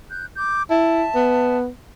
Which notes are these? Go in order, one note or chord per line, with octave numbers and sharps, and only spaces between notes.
F#6 G6
D6 G6
E4 E5 A5
B3